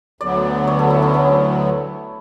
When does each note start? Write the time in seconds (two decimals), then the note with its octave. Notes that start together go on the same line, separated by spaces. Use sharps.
0.21 D2 D3 F#3 B3 D5
0.67 C#5
0.79 A4
0.90 E4
1.02 C#4
1.14 C#4